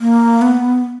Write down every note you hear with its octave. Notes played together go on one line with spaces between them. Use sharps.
A#3
B3